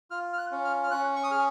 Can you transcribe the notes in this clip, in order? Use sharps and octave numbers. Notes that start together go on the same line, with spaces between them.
F4 F6
F6
F#6
C#4
F6
F6
C#4 F#6
C#6
D#6
G#4 F6